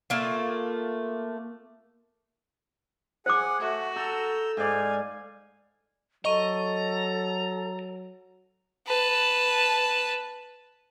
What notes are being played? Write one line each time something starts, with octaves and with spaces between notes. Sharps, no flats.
A3 A#3 F4
G#4 C5 F#5 G#5 D6
A3 F#4
A4 A#5 E6 G6
G#2 D5 F5 G#5
F#3 A4 D#5 A#5 C#6 D#7
B4 A5